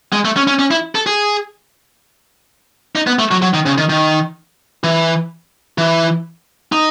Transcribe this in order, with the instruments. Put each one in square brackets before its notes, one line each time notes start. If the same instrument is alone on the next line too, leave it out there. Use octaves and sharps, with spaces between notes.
[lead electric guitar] G#3
A3
C#4
C#4
C#4
E4
A4
G#4
D#4
B3
A3
F#3
F#3
D#3
C#3
D#3
D#3
E3
E3
D#4